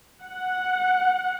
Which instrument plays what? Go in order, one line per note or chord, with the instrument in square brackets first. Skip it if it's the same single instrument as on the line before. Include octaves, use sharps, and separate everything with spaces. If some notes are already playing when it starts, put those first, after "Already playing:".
[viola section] F#5